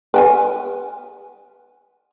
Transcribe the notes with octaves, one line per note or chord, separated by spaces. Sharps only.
B4 G5 G#5